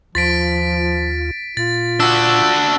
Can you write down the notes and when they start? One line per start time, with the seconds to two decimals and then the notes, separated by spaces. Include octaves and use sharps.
0.15 D#2 F3 F4 A6 B6 D7
1.57 A#2 F4 A6
2.00 D4 F#4 E6